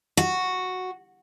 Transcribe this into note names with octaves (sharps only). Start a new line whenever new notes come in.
F#4